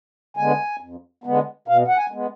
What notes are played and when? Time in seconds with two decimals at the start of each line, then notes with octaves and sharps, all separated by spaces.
0.37 D3 G#3 B3 G#5
0.80 F2
1.24 D3 G#3 B3
1.68 B2 F5
1.88 F#5
1.98 G#5
2.12 G#3 B3